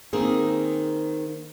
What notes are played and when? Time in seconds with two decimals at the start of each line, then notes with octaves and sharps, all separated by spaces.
0.13 D#3 A#3 C4 G#4